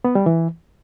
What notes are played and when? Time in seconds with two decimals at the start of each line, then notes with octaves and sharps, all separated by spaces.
0.05 B3
0.15 G3
0.26 E3